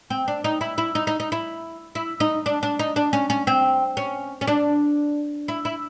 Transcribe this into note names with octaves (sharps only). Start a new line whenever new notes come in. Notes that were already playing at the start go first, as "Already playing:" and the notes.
C4
D4
D#4
E4
E4
D#4
D#4
D#4
E4
E4
D#4
D4
D4
D#4
D4
C#4
C#4
C4
C#4
C#4
D4
E4
E4